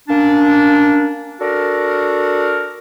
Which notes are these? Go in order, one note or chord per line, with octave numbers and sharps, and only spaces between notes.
A#3 C#4 D4
D4 F#4 A4 A#4